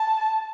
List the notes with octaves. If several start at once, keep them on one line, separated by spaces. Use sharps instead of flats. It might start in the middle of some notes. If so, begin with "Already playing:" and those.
Already playing: A5